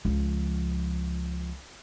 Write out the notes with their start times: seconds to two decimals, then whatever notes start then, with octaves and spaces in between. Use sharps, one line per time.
0.05 C#2 F3